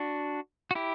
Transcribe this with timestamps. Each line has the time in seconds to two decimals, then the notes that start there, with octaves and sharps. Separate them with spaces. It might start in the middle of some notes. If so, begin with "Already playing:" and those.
Already playing: D4 F#4
0.71 F#4
0.75 E4 G4